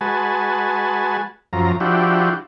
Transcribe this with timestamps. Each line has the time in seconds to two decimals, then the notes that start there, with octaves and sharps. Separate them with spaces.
0.01 G#3 F#4 B4 G#5 A5
1.53 F#2 F3 A#5
1.80 F3 D4 E4 F#4 G4